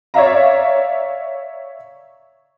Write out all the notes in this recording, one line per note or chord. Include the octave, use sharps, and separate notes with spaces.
C#5 D5 E5 F5 A#5